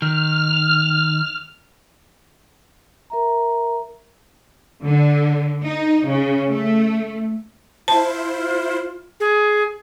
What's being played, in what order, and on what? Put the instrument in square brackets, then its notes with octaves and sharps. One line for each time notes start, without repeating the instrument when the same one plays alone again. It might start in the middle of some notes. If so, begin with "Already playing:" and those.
[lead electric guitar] D#3 [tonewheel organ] F6
[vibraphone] A#4 E5 A#5
[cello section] D3
D#4
C#3
A3
[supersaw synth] E4 C5 [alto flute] F4 [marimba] A5
[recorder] G#4